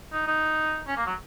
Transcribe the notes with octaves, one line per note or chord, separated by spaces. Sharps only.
D#4
D#4
C#4
A#3
F#3